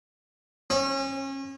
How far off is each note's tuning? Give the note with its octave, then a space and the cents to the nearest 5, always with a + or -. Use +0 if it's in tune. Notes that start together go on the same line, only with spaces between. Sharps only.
C#4 -30